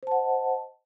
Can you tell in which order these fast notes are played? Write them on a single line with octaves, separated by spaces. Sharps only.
C5 A5 F#5 D#5